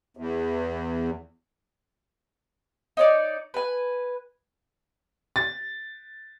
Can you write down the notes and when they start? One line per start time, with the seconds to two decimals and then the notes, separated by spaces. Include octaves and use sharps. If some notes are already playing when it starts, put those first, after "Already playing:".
0.17 E2
2.97 D#4 C#5 D5
3.54 B4 G#5
5.36 A6